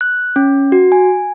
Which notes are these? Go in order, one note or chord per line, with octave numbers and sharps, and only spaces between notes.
F#6
C#4
F#4
G#5